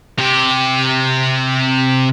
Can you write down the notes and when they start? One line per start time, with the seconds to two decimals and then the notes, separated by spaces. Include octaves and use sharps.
0.19 C3 G4